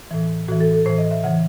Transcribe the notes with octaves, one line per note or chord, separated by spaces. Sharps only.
A2 E3
A2 E3 F#4
A4
A4
A2 E3 C5
D#5
E5
C#3 E3 F#5